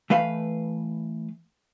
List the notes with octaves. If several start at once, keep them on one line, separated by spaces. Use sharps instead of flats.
E3 A3 B4 F5